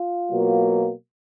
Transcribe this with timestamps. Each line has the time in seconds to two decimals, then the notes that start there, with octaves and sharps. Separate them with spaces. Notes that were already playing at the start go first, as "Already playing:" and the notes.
Already playing: F4
0.31 B2 F#3 A#3